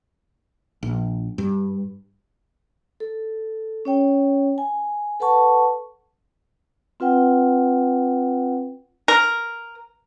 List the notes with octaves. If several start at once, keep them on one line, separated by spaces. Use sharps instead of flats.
A#1
G2
A4
C#4 C#5 G5
G#5
A4 B4 F#5 A5 C#6
C4 F4 B4 F#5 G5
A#4